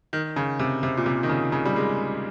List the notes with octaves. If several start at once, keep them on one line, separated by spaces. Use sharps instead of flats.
D#3
C#3
C3
C3
A#2
C3
D#3
C#3
C#3
G3
G#3